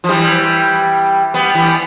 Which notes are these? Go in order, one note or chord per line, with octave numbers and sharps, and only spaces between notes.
F3
E3 G3
G3 B3
E3 G3